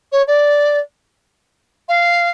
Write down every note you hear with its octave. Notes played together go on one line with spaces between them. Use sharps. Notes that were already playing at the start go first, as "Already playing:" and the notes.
C#5
D5
F5